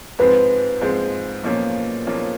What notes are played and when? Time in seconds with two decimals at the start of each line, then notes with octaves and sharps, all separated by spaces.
0.19 G#2 F3 G#3 C4 B4
0.81 G#2 F3 G#3 C4
1.44 B1 A#2 F3 A#3 C#4
2.07 B1 A#2 F3 A#3 C#4